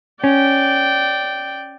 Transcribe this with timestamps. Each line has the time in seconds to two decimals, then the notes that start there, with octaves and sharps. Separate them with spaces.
0.24 C#4 D5 G5